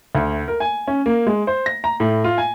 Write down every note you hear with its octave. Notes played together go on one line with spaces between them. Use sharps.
D2
A#4
G#5
C#4
A#3
G#3
C5
A#6
A#5
A2
F4
G#5